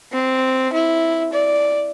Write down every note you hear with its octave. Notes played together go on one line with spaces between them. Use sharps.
C4
E4
D5